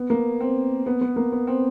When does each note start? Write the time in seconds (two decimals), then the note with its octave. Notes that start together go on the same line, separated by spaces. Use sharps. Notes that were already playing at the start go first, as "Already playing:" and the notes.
Already playing: B3
0.10 A#3
0.40 C4
0.86 B3
1.01 B3
1.16 A#3
1.32 B3
1.47 C4